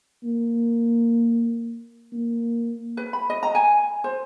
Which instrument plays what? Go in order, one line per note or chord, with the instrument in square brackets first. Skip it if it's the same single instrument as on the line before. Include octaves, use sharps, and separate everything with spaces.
[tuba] A#3
A#3
[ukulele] B4
B5
D#5
A#5
G#5
C5